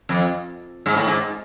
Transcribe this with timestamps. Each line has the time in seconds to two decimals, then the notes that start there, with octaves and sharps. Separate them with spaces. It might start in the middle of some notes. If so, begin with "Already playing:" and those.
0.09 F2
0.86 G#2
0.96 A2
1.08 G#2